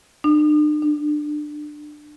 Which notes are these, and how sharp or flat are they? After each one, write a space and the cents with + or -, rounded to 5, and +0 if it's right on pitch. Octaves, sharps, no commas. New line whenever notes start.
D4 +45
D4 +25